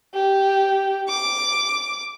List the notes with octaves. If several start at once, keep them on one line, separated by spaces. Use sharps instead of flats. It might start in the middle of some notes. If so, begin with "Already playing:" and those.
G4
D6